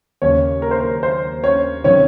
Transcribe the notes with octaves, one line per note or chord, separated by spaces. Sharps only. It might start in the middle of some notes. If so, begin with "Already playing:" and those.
D#2 C#3 C#4 C#5
A#4
C5
A#4
C5
C#4 C#5
C3 D#3 C#4 C#5